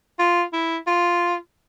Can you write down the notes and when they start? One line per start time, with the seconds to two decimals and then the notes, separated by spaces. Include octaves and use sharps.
0.19 F4
0.53 E4
0.87 F4